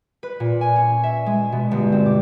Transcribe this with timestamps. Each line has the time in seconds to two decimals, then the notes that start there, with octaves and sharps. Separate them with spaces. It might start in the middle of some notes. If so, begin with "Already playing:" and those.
0.23 B4
0.40 A#2
0.61 G#5
0.76 C#4
1.03 E5
1.26 G#3
1.52 B2
1.71 G1
1.92 C4
2.06 D6